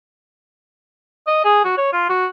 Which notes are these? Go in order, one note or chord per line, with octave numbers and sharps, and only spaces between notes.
D#5
G#4
F#4
C#5
F4
F#4